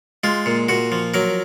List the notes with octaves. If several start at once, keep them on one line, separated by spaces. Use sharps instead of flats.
G#3 F4
A#2
A#2 F#4
F3
F#3 A#4